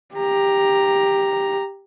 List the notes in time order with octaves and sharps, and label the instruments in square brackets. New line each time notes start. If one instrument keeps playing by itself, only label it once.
[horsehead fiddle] G4 A#5